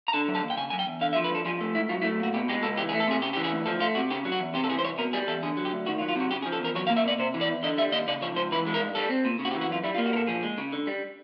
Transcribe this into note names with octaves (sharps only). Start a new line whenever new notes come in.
A#5
D3 A5
F#3
A5
D#2
G5
C#3 G#5
F#3 G#5
G5
E2
D3 F5
E5
F3
B4
G2 A4
F3 G#4
A3
G#2 E4
F#3 F4
E4
A3
A#2 F#4
B2 G4
G#3 G4
C#2 A4
E3 G4
G#4
A3
A4
C3 G#4
C#3 G4
E3 G4
G#4
D2
F3 A4
A3 F4
C3 F#4
C#3 G4
F#3
F#4
E2
C3 G4
A4
E3 G#4
C5
C2 C#5
B2 A#4
G3 G#4
E2 A4
D3 G#4
F#3
G4
D2
D#3 F#4
F4
F#3
F4
C3 F#4
C#3 G4
G#4
F3
A4
E2 A#4
F#3 C#5
F5
A#3
E5
B2 D5
C3 C5
E3
D5
E2
D3 D#5
G3 E5
D#2 D#5
C#3 D5
F3 C#5
C#2 C5
E3 B4
G#3
A#4
G2
G3 A4
C4
A#2
C#3
F#4
G4
E3
F#4
F#2 F4
G3 E4
F4
A#3
F#4
A#2 A4 A#4
F3 G#4
G#3
C#3
D3
G3